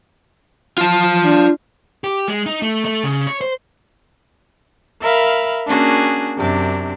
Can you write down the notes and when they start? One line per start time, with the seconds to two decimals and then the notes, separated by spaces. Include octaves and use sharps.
0.78 F4 A5
1.24 D4
2.04 G4
2.28 G#3
2.46 D#4
2.62 A3
2.85 A3
3.04 C#3
3.27 C#5
3.41 C5
5.02 A#4 E5 F5 B5
5.69 A#3 C#4 D4 F#4 G#4
6.38 F#2 C3 D4